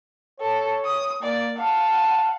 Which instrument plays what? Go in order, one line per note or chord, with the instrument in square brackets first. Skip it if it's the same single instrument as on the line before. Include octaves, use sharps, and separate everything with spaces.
[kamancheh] A4 [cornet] C#5
[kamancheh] D#6
[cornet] A#3 [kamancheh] D5
[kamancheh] F5 F#5 [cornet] A5